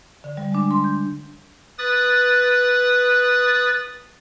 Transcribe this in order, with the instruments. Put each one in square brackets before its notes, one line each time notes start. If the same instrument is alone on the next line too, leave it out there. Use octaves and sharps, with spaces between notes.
[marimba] D3
G3
G#3 D4
C6
G6
[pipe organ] B4 D#6 A6